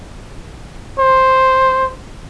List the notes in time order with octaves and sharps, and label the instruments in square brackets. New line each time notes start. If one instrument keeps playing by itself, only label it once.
[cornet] C5